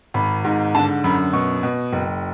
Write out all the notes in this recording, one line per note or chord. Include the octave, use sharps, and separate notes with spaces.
G#1 B5
G#2
D3 A5
F#2 B5
B2 C#6
B2
F#1